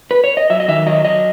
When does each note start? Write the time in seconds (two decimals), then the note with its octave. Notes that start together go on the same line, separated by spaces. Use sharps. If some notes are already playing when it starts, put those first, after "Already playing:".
0.11 B4
0.24 C#5
0.37 D#5
0.50 F#3 E5
0.60 D#5
0.68 D#3 E5
0.87 F#3 D#5
1.04 F#3 D#5